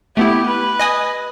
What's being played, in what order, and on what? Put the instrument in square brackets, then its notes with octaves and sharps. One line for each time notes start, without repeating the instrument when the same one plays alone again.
[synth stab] A3 B3 E4 [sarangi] G4
[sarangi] B4
[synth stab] D#5 G#5 D#6